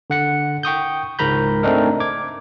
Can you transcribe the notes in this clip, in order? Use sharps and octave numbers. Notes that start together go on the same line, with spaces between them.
D3 F#5 C#7
G5 C#6 D#6 G6
C#2 G#2 A#4 A#5 B5 G6
A3 C4 D4 D#4 A#4
D6 G#6